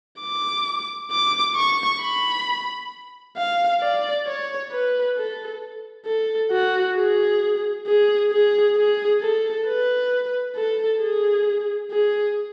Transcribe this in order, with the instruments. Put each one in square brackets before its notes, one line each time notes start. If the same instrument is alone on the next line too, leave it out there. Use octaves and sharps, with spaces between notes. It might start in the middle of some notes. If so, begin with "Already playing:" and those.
[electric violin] D6
D6
C#6
B5
F5
D5
C#5
B4
A4
A4
F#4
G#4
G#4
G#4
G#4
A4
B4
A4
G#4
G#4